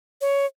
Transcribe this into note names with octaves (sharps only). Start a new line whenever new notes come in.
C#5